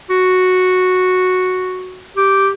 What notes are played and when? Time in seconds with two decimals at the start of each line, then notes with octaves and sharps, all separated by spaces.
0.10 F#4
2.16 G4